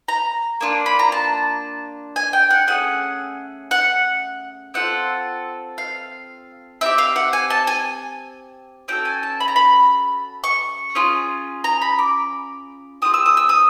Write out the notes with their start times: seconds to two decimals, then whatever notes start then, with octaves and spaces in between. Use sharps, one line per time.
0.08 A#5
0.61 A#3 D4 F4
0.86 B5
0.99 A#5
1.12 A5
2.16 G#5
2.33 G5
2.50 F#5
2.67 A3 C#4 G#4 F#5
3.71 F#5
4.74 C4 F4 A4 F#5
5.78 F5
6.81 C4 E4 E5
6.86 G4
6.98 F5
7.16 F#5
7.33 G#5
7.50 A5
7.67 G#5
8.88 C#4 F#4 A4 G5
9.05 G#5
9.23 A5
9.40 B5
9.48 A#5
9.56 B5
10.44 C#6
10.95 C#4 F4 G#4
11.64 A#5
11.81 B5
11.99 D6
13.02 C4 F4 G#4 D#6
13.14 E6
13.26 D#6
13.37 E6
13.49 D#6